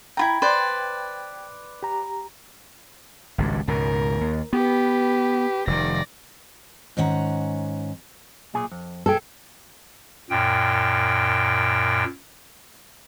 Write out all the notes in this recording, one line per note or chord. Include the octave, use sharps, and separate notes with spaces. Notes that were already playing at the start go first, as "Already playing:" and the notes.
E4 F4 G5 A#5 B5 G#6
B4 C5 D5
G4 A#5
G#1 C#2 G2
C#2 G#2 B2 A#4
D#2
B3 G4 B4
F1 D#3 D5 A#6
G#2 D#3 C#4 F#5 A#5
B1 A#2 G#4
F2
B1 G#4 A4 G5
F#2 A#2 G5